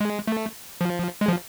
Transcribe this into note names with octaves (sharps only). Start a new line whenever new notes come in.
G#3
A3
F3
G#3
F3